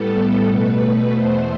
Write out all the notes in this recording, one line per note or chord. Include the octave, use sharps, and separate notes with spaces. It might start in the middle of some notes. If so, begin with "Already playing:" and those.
Already playing: A2 G3 B3 A4
B2 A3 B4
E2 B2 A3 C5